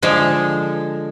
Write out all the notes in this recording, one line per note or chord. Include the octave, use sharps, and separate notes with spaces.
D3 F3 G#3